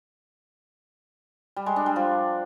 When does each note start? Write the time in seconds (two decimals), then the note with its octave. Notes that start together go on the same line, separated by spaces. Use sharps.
1.56 G3
1.66 G#3
1.76 D4
1.86 G3
1.96 F3